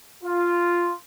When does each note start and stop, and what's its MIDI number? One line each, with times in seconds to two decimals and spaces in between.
0.24 0.91 65